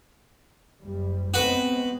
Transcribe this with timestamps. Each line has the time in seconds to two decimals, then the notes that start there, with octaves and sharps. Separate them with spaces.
0.83 F#1 G3
1.34 G#3 B3 C4 F#4 B4